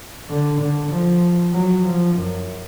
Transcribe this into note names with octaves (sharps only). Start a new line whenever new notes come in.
D3
D3
F3
F#3
F3
F#2